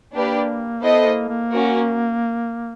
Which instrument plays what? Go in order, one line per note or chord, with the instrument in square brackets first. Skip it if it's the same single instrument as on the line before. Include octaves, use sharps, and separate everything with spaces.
[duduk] A#3 [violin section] D4 G4 B4 D5
[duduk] B3 [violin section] E4 A4 C5 D#5
[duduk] A#3
A#3
[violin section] C#4 F#4 A#4